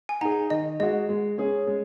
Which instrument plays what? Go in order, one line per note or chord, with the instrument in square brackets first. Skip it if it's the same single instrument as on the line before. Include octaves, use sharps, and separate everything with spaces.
[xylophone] G#5
[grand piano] D#4 [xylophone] F#5 A#5
[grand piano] G#4
[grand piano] D#3 [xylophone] D#5
[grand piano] G#3 F#4 [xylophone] D#5
[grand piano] G#3
C#4 G#4
G#3